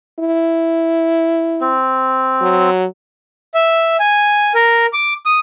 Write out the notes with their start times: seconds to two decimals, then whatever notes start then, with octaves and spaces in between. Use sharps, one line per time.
0.20 E4
1.61 C4
2.42 F#3
3.55 E5
4.00 G#5
4.55 A#4
4.93 D6
5.26 D#6